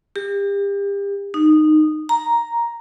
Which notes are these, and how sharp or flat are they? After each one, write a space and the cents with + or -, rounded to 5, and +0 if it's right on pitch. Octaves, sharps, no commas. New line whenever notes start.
G4 +35
D#4 -15
A#5 +5